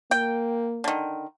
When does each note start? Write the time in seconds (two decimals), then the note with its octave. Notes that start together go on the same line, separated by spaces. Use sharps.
0.11 A#3 G5
0.84 D3 D#3